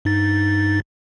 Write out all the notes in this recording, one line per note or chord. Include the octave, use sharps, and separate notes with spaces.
G2 D#4 A6